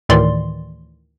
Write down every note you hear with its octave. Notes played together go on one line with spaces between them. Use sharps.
D2 A2 D#3 E3 D5 C6